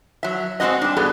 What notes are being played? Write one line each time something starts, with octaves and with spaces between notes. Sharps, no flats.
F#3 E5
G#3 C4 E4 F#4 D#5
G3 D4
G2 B3 G#4 A4